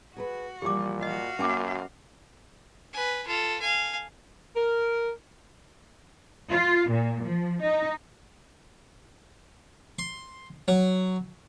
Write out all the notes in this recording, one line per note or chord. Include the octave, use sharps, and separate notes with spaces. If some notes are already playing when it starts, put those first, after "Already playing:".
F#4 G#4 A#4 B4
A#2 E3 F3 G3 G4 D6
F#4 D#5 F5
F#2 A#3 C#4 G#5 D6
B4 G#5
F4 A4
F5 G#5
A#4
F4
A#2
F3
D#4
C6
F#3